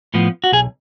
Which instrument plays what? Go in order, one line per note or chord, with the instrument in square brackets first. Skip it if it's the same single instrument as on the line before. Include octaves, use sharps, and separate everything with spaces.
[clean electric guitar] A2 F3 B3
F#4
B1 G#4